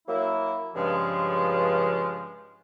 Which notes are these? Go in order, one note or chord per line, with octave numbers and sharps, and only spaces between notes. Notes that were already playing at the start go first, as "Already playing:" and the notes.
F#3 A#3 E4
G2 C#3 F3 G#3